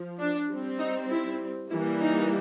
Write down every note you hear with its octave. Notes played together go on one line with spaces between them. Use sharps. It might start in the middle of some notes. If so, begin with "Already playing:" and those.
Already playing: F3
D4
G3 C4
D#4
E4
E3 G3 A#3 E4
D#4